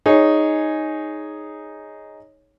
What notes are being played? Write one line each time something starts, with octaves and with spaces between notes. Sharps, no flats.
D#4 G#4 C#5